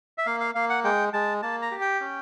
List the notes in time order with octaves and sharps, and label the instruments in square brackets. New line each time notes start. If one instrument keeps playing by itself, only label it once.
[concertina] E5
A#3 F5
F5
A#3 F5
F#5
G#3 G5
G#3 A5
A#3 A5
A#5
G4
G5
C#4